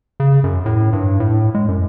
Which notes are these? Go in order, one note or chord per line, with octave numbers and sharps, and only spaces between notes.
C#3
F#2
A2
G2
A2
G#3
F#2